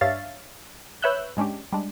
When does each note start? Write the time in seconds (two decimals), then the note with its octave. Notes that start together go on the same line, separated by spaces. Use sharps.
0.01 G2 D4 C#5 E5 F5 A6
1.02 B4 C#5 E5 E6 F#6 G6
1.37 G#2 G#3 C#4 D4 G4
1.72 G3 G#3 D4